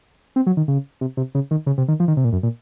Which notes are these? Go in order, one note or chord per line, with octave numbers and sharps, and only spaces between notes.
C4
F#3
D#3
C#3
C3
C3
C#3
D#3
C#3
C3
D#3
F3
D#3
C3
A#2
F#2
A#2